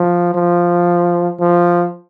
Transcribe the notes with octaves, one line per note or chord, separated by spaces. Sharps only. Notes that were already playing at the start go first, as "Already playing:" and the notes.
Already playing: F3
F3
F3